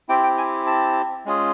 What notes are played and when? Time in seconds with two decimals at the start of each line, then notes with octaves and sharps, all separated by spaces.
0.09 C4 E4 G4 G5
0.24 G5
0.38 G#5
0.67 A5
1.26 G#3 C#4 F4 G#4